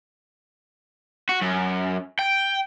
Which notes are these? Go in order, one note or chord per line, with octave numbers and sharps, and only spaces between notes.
F#4
F#2
G5